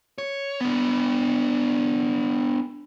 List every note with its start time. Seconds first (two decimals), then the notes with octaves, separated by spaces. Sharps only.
0.18 C#5
0.61 B3 D4